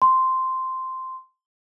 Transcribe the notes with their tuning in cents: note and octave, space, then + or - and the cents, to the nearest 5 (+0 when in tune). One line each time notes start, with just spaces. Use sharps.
C6 -5